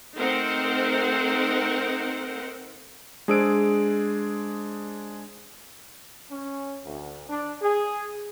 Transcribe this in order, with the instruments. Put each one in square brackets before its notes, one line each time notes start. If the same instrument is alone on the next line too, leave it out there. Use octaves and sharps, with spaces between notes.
[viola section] A3 C4 D#4 A#4 C5 F#5
[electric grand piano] G#3 D4 G#4 C5 E6 D7
[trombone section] C#4
D2
D4
G#4